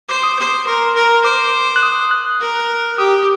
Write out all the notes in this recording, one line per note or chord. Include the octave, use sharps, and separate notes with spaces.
C5 D6
D#6
C5 D6
A#4 C6
A#4
C5 D6
F#6
D#6
F#6
A#4
G4 D#6